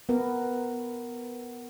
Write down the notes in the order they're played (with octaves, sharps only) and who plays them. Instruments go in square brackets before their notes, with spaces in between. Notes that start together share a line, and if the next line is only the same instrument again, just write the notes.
[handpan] B3 A#4